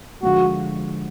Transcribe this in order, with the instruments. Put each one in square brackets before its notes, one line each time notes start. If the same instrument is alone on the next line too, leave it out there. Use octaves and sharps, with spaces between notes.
[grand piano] D3 F3 G#3 [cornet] F#4